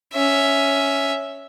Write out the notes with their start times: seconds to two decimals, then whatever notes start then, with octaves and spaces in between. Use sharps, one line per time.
0.14 C#4 E5